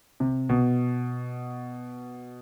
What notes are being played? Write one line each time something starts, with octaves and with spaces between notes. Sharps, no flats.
C3
B2